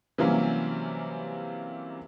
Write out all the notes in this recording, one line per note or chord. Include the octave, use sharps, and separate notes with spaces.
C3 E3 F#3 G3 A#3 C#4